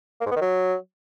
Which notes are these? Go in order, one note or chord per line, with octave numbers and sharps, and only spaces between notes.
A#3
G#2
B3
D#3
F#3